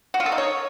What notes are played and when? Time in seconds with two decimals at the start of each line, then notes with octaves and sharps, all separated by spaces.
0.14 F#4
0.20 F4
0.26 A4
0.32 D#4
0.38 C#5